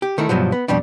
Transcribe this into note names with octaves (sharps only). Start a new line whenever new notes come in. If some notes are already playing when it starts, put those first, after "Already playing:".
G4
D#3 A3 E4
G2 B2 F3 F#3
B3
F2 B2 G3 D4